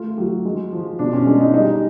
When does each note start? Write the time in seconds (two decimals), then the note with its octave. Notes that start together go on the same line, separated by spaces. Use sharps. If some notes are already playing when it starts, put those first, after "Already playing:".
Already playing: A3 F4
0.18 F#3
0.45 G#3
0.73 F3
0.99 B2 D4
1.13 C#4
1.26 G#3 D4
1.40 D#4
1.54 G3 D#4